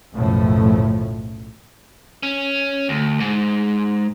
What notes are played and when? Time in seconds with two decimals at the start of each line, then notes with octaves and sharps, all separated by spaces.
0.13 B1 F#2 A2 C#3 F3 A3
2.23 C#4
2.89 D2
3.20 G#2